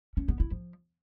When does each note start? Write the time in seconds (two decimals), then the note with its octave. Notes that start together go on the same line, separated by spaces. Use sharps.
0.17 C#4
0.28 B3
0.40 E4
0.51 F3